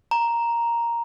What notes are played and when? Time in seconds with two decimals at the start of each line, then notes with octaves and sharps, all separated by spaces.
0.11 A#5